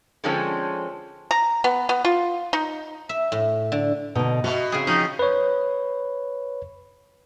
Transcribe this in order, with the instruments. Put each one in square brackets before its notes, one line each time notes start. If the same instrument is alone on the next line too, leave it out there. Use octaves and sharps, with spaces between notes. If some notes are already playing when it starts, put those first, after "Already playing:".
[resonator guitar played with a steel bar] D3 F3 G#3 C4 C#4 A4
[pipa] A#5
B3
B3
F4
D#4
[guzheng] E5
A2
D3
[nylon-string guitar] B2 D3 [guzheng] D#4
[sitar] B2 [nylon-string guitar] F#4 E5
[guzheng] C#3 C4 G#4
[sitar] F3 [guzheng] C#4 [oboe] D#4
[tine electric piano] B4 C#5